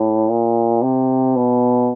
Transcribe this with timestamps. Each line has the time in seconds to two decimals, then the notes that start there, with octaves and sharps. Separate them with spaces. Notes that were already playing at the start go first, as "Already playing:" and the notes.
Already playing: A2
0.29 A#2
0.82 C3
1.36 B2